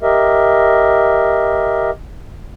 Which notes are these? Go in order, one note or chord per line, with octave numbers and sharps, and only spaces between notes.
G4 A#4 D#5 E5